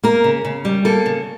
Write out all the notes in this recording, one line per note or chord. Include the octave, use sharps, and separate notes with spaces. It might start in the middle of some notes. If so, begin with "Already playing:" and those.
A#3 A#4
C#3
C#3
G3
A#3 A4
C#3